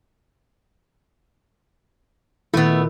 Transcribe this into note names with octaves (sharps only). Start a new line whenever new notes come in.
A#2 D#3 A3 B3 E4